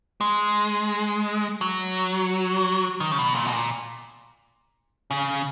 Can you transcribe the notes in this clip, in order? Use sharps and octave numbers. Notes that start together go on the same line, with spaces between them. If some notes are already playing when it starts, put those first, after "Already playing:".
G#3
F#3
D#3
C#3
B2
A#2
B2
A#2
C#3